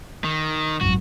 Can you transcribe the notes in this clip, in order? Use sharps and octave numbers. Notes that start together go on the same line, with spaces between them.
D#3
G#1 F#2 F#4